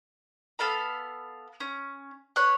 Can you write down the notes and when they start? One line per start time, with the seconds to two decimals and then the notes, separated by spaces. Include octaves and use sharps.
0.59 B3 A4 F5 B5
1.60 C#4
2.36 B4 C#5 F#6